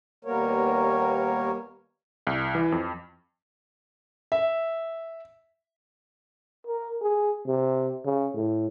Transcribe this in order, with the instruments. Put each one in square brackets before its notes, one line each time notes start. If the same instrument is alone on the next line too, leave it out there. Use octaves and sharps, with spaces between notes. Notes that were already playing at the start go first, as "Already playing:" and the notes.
[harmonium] D#2 G3 A#3 B3 A#4 C#5
[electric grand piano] C2
E3
F2
[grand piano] E5
[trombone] A#4
G#4
C3
C#3
A2